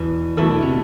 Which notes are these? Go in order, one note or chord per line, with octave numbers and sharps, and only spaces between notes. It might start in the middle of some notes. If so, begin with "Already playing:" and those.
Already playing: E2 B2 E3
B2 E3 A3 E4 A4
D3
C3